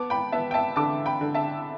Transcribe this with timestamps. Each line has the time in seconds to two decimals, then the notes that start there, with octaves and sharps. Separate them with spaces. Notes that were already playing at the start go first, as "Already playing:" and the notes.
Already playing: B3 A5 D6
0.10 G5 B5
0.32 B3 E5 A5
0.51 G5
0.54 E5 A5
0.76 D3 A5 D6
1.06 G5 B5
1.21 D3
1.35 E5 A5